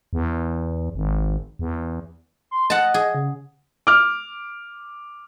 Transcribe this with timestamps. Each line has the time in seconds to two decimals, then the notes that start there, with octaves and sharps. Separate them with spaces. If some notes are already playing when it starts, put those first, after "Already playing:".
0.13 E2
0.95 G#1
1.59 E2
2.51 C6
2.70 D#5 F#5 A5
2.94 G#4
3.15 C#3
3.87 D6 F6